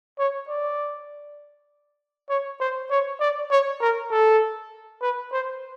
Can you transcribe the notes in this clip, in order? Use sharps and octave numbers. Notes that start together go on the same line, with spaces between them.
C#5
D5
C#5
C5
C#5
D5
C#5
A#4
A4
B4
C5